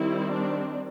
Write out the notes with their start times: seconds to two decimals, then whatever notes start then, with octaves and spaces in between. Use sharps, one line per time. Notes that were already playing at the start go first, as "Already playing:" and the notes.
Already playing: D#3 G3 C4 E4
0.32 D4